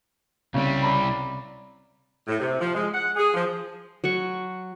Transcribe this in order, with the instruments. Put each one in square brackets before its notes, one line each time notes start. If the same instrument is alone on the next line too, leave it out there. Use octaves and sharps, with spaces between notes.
[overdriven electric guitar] C2 G3 [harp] C#3 C4
[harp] D5 A#5 B5
[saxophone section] A2
C3
F3
G#3
F#5
G#4
F3
[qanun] F#3 F#5 C#6